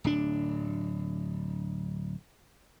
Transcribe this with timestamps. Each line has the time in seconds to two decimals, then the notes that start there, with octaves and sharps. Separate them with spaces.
0.04 D1 D4